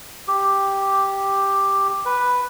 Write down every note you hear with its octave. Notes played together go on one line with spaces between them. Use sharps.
G4
B4